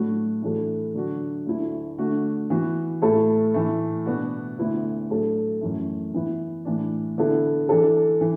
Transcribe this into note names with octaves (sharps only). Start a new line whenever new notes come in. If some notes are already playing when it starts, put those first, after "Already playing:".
Already playing: A2 F#3 A3 D4 F#4
A2 E3 D4 F#4 A4
D3 F#3 D4 F#4
D2 D3 A3 E4
D3 A3 D4 F#4
E3 B3 F#4
A2 A3 E4 A4
A2 E3 A3
B2 B3 D4 F#4
D2 D3 B3 E4
A2 F#3 D4 A4
F#2 E3 A3
E3 B3 E4
A2 E3 D4
D3 B3 E4 A4
E3 D4 A4
E3